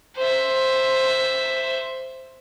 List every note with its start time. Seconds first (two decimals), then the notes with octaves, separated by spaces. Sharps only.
0.17 C5 E5